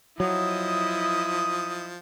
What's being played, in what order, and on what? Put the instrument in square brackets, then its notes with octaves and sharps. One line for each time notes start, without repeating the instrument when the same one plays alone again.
[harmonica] F3 [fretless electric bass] F#3 [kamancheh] E4 D#5 [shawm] D#6